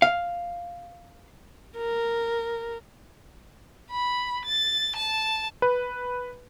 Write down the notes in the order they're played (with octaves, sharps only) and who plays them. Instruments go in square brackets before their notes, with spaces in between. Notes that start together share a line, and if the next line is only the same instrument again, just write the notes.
[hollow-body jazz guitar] F5
[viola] A#4
[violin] B5
A6
A5
[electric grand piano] B4